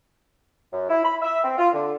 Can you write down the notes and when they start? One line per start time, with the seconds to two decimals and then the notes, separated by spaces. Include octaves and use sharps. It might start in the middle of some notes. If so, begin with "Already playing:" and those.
0.71 F#2
0.88 E4
1.04 B5
1.21 E5
1.43 C4
1.57 F4
1.73 D3